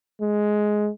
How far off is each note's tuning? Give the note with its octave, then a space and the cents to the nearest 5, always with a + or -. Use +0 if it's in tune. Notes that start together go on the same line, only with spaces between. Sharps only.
G#3 +10